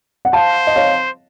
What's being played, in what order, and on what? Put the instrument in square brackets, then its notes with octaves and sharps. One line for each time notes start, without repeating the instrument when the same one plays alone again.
[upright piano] F#5
[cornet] C5 [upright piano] F5 A5
[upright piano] D#5
C#5 F5